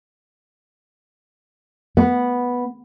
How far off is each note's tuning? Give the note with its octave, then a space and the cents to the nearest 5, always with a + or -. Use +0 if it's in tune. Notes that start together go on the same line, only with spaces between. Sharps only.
B3 -5